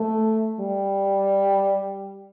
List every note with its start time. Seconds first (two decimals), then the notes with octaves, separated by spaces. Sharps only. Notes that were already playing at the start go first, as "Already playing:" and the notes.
Already playing: A3
0.60 G3